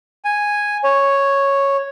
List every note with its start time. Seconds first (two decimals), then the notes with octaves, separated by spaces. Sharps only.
0.25 G#5
0.84 C#5